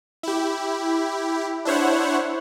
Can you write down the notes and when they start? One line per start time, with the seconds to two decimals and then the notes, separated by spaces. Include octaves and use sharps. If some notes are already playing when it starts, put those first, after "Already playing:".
0.23 E4 G4
1.65 D4 E4 C5 C#5 F#5